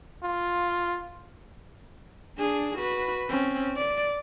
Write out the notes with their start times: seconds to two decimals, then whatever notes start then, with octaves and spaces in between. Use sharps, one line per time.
0.23 F4
2.38 D4 G#4
2.78 F#4 B4
3.29 C4 C#4
3.76 D5